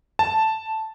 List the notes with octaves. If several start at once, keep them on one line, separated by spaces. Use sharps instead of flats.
A5